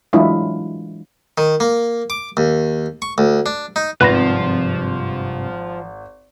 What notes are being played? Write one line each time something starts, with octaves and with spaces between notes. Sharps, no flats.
E3 F#3 G#3 D4 E4 F4
D#3
A#3
D6
D#2
C#6
D2
D4
D#4
G#1 G2 C3 F3 B3 B4 B5 A#6